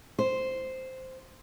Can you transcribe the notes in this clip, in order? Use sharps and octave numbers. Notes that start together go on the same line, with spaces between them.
C5